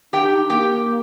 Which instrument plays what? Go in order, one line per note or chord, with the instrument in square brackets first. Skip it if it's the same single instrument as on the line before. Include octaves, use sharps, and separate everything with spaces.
[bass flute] D4 [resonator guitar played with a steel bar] G4 G5
[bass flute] D#4
[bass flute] A#3 [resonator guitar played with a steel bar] G4 G5